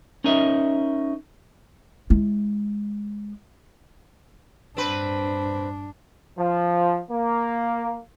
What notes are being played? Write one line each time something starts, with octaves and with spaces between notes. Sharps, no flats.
C#4 D#4 A#4 D#5 E5
G#3 E4
G2 C4 D4 B4
F3
A#3